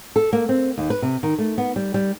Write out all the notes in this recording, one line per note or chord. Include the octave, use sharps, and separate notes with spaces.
A4
A#3
C4
D#2
B4
C3
D#3
A3
B3
G3
G3